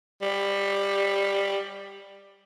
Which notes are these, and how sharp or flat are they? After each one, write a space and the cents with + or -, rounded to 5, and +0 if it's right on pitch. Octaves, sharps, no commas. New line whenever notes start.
G3 +15